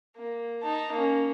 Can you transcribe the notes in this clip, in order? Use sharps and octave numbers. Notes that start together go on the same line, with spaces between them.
A#3
D#4 A5
A#3 C#4